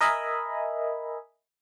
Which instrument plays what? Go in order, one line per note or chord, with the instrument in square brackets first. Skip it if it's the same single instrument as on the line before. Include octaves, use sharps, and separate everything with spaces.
[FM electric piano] A#4 D#5 E5 G#5 B5